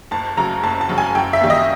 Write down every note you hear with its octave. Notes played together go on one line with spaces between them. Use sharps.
F#1 A5
F#2 C#3 F#3 A#5
F#1 A5
A5
F#2 C#3 F#3
G#5
F#2 G5
E5
D#3 G3 A#3
D#5